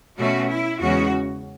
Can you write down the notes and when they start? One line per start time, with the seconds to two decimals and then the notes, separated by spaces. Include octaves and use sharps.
0.17 B2 A3 C#4 F#4
0.49 E4
0.80 E2 C#3 G#3 C#4 F#4